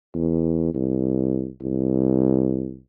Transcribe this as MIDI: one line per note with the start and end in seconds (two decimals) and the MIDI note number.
0.14 0.72 40
0.74 1.48 36
1.62 2.79 36